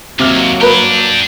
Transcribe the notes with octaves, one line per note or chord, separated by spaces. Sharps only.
D#2 C3 F#3 A#3 D6 F6
D4 G4 A#4 B4